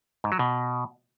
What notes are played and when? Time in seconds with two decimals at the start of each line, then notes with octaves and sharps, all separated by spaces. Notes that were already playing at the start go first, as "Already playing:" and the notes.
0.24 G#2
0.32 F#3
0.39 B2